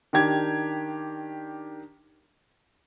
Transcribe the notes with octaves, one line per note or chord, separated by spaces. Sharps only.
D#3 D4 G4 G#6